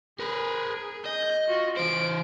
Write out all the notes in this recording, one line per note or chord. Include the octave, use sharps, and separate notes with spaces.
G#4 A#4 B4
D#5 G6
F4 F#4
E3 C5 D7